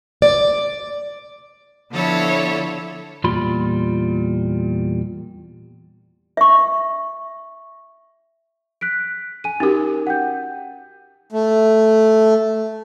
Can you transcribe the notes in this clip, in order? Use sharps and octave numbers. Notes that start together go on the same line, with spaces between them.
D5
D3 F3 B3 E4 A4 C#5
E2 A#2 G3 F4 B5 C6
E5 C#6
F#6 B6 D7
G#5 D#7
C#4 D#4 F#4 G4 A#4
F#5 G5 G6
A3